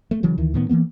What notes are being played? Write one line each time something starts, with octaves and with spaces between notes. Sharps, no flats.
A3
C#3 E3 F#3
D2 D#3 E3
A2 D#3 B3
E3 F#3 A#3 B3